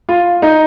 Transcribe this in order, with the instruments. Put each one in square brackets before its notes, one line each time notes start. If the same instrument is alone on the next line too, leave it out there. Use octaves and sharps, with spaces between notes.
[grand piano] F4
D#4